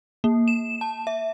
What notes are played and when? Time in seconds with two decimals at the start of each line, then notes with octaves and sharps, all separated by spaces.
0.24 A#3
0.48 E7
0.81 A5
1.07 E5